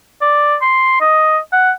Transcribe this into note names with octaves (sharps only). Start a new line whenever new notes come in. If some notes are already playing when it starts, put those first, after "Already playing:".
D5
C6
D#5
F#5